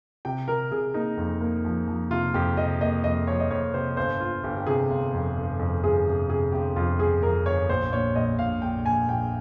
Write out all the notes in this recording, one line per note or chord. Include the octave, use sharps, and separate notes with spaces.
C3 G5
C3 A#4
C3 G#4
A#3 D#4
F2
A#3
F3
F3
C3 F4
F2 G4
C3 D#5
A#3 D#5
F2 D#5
F3 C#5
D#5
F2 C#5
C3 C5
G1 C5
G1 F4
G1 G4
G4
C3 G#4
G1
F2
G1
F2
G1 G#4
C3
C3 G#4
G1 G4
F2 F4
G1 G#4
F2 A#4
G1 C#5
A#1 C5
A#2 C#5
A#1 D#5
A#1 F5
A#1 G5
A#1 G#5
A#1 G5